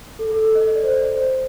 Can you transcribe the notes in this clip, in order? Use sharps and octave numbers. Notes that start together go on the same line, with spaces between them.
A4
A4
A4
D#5
D#5
D5
C5
D5
C5